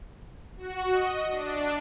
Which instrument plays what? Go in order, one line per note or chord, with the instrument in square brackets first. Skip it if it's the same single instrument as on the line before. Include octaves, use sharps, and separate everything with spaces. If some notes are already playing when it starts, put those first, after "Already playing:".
[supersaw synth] F#4
D#5
D4